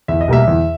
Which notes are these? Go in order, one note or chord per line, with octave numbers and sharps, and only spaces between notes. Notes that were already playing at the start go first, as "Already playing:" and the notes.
E2 E5
D#5
B2 G3 A#3 E5
E2